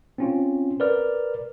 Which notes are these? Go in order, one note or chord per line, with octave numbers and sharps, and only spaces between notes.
C4 C#4 F4
A#4 B4 D5 F6